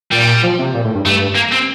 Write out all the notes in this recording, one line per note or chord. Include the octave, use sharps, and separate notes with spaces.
A#2 G3
F3
C3
A#2
A2
G2
G2 A3
A#3
C4